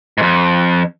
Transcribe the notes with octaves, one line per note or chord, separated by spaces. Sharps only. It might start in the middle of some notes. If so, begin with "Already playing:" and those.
F2 G#2